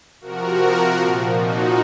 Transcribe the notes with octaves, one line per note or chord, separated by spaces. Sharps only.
C3 F3 F#4 A#4
A#2 F3
D#4 F#4